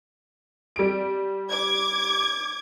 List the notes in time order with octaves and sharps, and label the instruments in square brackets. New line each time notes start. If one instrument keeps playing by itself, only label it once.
[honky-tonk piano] G3 D7
[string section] D6 G#6